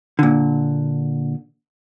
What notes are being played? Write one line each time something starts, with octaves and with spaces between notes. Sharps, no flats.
A#2 D3